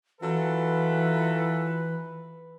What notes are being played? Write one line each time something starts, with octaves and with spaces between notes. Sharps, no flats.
E3 F#3 F4 A4 B4